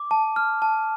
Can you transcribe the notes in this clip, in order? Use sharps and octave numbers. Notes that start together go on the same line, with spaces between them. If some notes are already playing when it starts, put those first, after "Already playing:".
Already playing: D6
A5
F6
A5